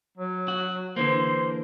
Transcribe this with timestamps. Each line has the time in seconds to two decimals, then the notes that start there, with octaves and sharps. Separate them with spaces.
0.18 F#3
0.48 F#4
0.96 D3 E3 A#3 C5